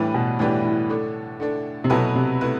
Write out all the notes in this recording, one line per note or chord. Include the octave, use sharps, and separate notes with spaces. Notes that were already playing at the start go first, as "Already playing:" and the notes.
Already playing: A2 E3 G3 D4 G4 B4
B2
A2 E3 G3 D4 G4 B4
A2
D3 A3 D4
D3 A3 D4
C3
B2 F#3 A3 E4 B4
C3
A3 E4 B4